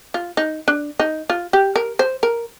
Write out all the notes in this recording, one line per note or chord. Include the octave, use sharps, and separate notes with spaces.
F4
D#4
D4
D#4
F4
G4
A#4
C5
A#4